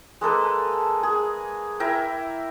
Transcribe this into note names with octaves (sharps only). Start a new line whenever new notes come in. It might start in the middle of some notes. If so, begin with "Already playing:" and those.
G#3 A#3 A4 B4
G#4
E4 A#4 E5 G5